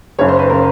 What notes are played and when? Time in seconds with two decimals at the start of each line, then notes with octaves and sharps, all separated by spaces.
0.19 F#1 F#2 C#3 C#5
0.28 C5
0.39 B4
0.50 A#4
0.53 C#3